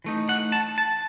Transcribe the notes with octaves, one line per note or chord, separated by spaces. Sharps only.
E3 A3 D#4
F#5
A5
A5